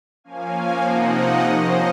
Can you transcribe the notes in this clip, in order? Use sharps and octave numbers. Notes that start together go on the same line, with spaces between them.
F3 A#3 C#4 F5 G#5
C3 F3 A#3 D#4 D#5 F#5
F3 A#3 C#4 C5 D#5